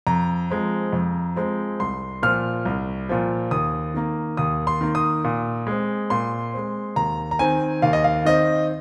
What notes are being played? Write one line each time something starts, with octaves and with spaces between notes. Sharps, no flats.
F2 A#5
F3 G#3 C4
F2
F3 G#3 C4
C2 C6
A#2 F3 F6
C2
A#2 F3
D#2 D#6
D#3 A#3
D#2 D#6
C6
D#3 A#3
D#6
A#2
G#3 C4
A#2 C6
G#3 C4
D#2 A#5
A#5
D#3 C4 G#5
D#2 F5
D#5
F5
D#3 C4 D#5